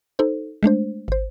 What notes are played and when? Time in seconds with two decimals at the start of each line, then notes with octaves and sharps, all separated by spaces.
0.19 D#4 A4 C5
0.63 G#3 A3 D4 C5
1.08 G#1 C5